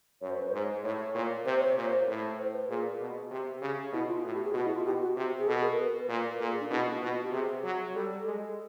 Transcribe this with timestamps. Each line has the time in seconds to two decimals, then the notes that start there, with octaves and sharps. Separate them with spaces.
0.22 F#2 C#5
0.30 C5
0.39 B4
0.47 C5
0.54 G#2
0.84 A2 C#5
1.15 A#2
1.45 C3 C5
1.60 C#5
1.73 A#2 C5
2.08 A2
2.38 C5
2.54 B4
2.69 A#2 G#4
3.00 B2
3.31 C3 G4
3.62 C#3
3.93 B2 E4
4.08 F4
4.24 A2 F#4
4.34 G4
4.45 G#4
4.54 B2 F#4
4.65 E4
4.75 F4
4.85 B2 G4
5.01 F#4
5.16 C3
5.39 G#4
5.47 B2 A4
5.63 A#4
5.78 B4
6.09 A#2
6.40 A#2 A4
6.51 G#4
6.60 D4
6.71 B2 E4
6.81 D#4
6.86 A#3
6.91 B3
7.02 B2 F4
7.11 F#4
7.22 G4
7.32 C3 G#4
7.64 F#3
7.94 G3 A4
8.26 G#3